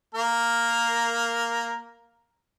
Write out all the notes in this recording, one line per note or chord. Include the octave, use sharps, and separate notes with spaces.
A#3 A#4